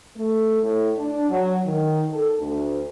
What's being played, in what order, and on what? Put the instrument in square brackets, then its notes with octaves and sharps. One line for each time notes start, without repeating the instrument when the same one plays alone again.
[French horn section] A3
A2
D4
F#3
D#3
A4
D2